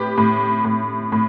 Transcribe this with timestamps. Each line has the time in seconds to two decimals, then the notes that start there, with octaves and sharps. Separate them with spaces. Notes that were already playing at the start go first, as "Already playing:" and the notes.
Already playing: A2 G4 B4
0.18 A2
0.65 A2
1.12 A2